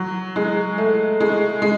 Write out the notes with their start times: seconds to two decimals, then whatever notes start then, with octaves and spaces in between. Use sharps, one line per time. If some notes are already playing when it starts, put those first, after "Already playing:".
Already playing: F#3
0.36 G#3
0.78 A3
1.20 G#3
1.62 G#3